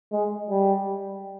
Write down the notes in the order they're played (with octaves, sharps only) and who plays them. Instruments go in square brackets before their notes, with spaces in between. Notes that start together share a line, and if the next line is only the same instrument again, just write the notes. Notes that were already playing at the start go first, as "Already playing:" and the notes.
[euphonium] G#3
G3